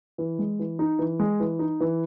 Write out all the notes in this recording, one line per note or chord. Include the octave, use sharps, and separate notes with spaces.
E3
G#3
E3
D#4
E3
G#3
E3
D#4
E3